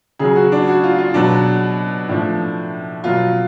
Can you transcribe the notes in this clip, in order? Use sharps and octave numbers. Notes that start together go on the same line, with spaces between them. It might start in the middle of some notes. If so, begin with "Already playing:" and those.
C#3 F#3 G#4
F#4
D4
F#4
F4
F4
B2 F#3 D4
A2 F3 D4
B2 F#3 F4